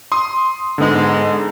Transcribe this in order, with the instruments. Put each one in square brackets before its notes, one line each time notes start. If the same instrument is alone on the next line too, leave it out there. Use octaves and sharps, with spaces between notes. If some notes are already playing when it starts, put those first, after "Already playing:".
[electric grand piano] C6 D#6
[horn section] G#2 G#3 [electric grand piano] D3 B3 D#4